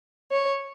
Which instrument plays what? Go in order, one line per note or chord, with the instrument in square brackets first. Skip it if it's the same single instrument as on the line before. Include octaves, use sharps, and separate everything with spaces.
[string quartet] C#5